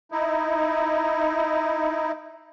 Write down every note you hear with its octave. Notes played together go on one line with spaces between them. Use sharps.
D#4 E4